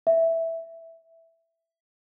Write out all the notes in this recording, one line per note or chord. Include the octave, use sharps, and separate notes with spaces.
E5